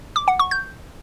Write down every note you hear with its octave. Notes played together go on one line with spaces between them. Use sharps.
D6
F#5
C#6
G6